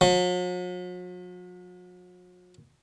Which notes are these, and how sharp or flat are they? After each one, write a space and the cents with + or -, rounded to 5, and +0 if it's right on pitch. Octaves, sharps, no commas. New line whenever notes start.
F#3 -45